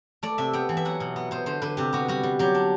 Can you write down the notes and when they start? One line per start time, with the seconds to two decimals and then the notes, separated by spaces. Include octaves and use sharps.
0.23 A3 D5
0.38 C3 E5
0.53 B3 G5
0.69 E3
0.77 E5
0.85 F#3 F#5
1.00 B2
1.16 B3
1.31 B3 C5
1.46 D3 C5
1.62 D3 B4
1.77 C3 G4
1.93 B3 F#4
2.08 G3 F#4
2.23 G3
2.39 F#3 G4
2.55 D4